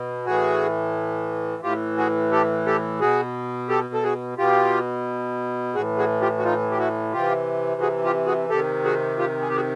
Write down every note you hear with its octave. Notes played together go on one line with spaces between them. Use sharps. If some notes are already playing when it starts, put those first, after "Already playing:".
Already playing: B2
A2 E3 F#4 G#4
A2 E3 F4 G4
F#4 G#4
G4 A4
G4 A4
B2 F#4 G#4
G4 A4
A4
F#4 G#4
B2 F4 G4
A2 E3 F#4 G#4
F#4 G#4
F4 G4
F#4
D#4 F4
G4
E4 F#4
C3 E3 F4 G4
F#4 G#4
F4 G4
F#4 G#4
C3 D#3 G4 A4
F#4 G#4
F4 G4
G#4
G4
F#4 G#4